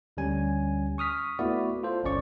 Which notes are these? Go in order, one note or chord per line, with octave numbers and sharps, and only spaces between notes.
D2 D3 G3 C#4 G#5
C#6 D#6 F6 B6
A3 B3 E4 F#4 D5
F4 A4 C5
G1 C2 C#4 D5 C#6